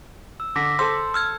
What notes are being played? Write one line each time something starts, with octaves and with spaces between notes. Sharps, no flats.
E6
D3 D6 A#6 B6
A4 C5 C6 E6
E6 F6 G#6